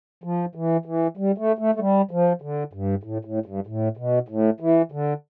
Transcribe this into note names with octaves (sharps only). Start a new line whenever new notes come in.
F3
E3
E3
G3
A3
A3
A3
G3
F3
D3
G2
A2
A2
G2
A2
B2
A2
E3
D3